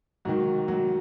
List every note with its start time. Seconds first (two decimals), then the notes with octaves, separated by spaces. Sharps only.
0.25 G#2 D#3 F#3 F#4
0.68 F#3 F#4